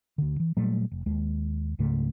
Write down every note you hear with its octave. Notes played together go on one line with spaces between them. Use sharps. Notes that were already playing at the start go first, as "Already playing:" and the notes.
D2 D3
E3
A#2 F#3 G3 A3
F1
D#2 G#3
C#2 G#2 C#3 A3